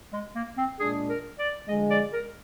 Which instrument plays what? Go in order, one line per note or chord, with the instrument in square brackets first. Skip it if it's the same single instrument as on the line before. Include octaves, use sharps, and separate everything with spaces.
[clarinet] G#3
A#3
C4
[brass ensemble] A#2 G#3 D4 [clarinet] G#4
[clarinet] A#4
D5
[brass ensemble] D3 F3 G#3 [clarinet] D#5
[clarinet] D5
A#4